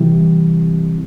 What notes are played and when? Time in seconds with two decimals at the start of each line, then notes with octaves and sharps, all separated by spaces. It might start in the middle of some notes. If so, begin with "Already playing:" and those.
Already playing: C3 E3 G3